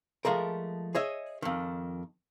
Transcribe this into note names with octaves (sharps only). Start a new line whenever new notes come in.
F3 G#3 A3 A#4
G#4 C#5 D#5 E5
F2 D#3